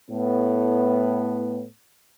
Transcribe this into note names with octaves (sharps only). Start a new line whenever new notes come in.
A2 B3